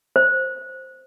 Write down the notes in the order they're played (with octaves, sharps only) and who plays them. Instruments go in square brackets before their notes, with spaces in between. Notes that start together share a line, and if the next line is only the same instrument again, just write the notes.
[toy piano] C5